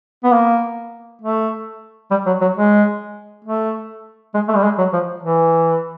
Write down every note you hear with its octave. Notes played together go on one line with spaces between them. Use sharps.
B3
A#3
A3
G3
F#3
F#3
G#3
A3
G#3
A3
G3
G#3
F#3
F3
E3